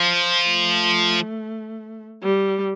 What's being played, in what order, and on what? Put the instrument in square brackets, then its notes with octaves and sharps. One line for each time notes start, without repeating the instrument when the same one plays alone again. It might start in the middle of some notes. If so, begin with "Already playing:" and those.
Already playing: [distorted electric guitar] F3
[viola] A3
G3